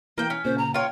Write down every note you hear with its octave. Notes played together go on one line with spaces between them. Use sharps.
E3 A#3 F5 G5
C#4 B6
A#2 C#3 C5
A#5
F4 C#5 G5